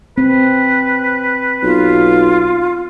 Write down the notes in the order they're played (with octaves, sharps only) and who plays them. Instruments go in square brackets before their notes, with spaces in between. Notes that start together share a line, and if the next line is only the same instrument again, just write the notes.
[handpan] C4 [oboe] B4
[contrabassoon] B1 [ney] F4